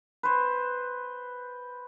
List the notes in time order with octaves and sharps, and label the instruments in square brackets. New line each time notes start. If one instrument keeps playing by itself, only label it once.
[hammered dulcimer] B4 C5